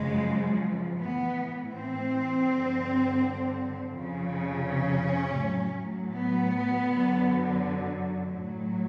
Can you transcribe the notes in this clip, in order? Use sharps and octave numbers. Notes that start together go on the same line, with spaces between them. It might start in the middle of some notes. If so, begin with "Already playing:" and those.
Already playing: F#2 C#3 F3 G#3
A2 E3 B3
C4
G2 D3 F3
F2 C#3 F3
C#4
A2 F#3
B3
F#2 D3 F#3
A2 F#3